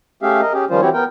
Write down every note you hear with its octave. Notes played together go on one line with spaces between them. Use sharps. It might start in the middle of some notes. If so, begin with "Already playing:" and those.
A3 C#4 G4 G#4 E5 F5
A#4 D#5
C#4 G4 G#4
D#3 F3 G3 C#4 F4 C5
E3 C4 E4 F#4 G4 C#5
B3 A#4 G5